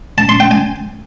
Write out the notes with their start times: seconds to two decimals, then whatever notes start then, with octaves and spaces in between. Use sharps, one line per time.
0.18 A5
0.29 C6
0.40 G5
0.51 G#5